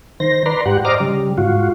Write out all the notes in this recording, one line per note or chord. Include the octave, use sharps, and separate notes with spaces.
D#3 C5 A#6
B4 D5 A#5 C6
G#2 G4 F#5
C5 D5 D#5 A#5 D6 F6
C#3 G3
G#2 F4 F#4